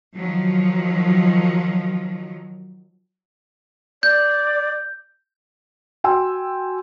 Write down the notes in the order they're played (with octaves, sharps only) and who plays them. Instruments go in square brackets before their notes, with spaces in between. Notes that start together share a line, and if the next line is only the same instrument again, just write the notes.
[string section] D#3 F3 F#3
[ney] D5 [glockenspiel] G6
[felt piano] F#4 G5 G#5 C6 E6